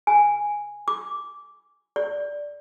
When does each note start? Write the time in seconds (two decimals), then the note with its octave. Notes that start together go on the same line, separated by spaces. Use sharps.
0.07 G#5
0.88 D6
1.96 D5